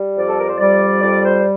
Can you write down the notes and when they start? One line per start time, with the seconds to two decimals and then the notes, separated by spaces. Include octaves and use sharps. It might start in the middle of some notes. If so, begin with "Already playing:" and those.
Already playing: G3
0.16 F2 D5
0.29 A4
0.40 A#4
0.49 C5
0.59 G3 D5
1.03 F2 D5
1.24 C5